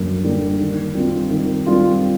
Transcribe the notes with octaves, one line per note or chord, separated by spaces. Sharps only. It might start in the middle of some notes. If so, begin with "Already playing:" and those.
Already playing: F#2 D3 G3 A#3
D3 G3 A#3
D#3
G3 C4 F4
D#3
G3 C4 F4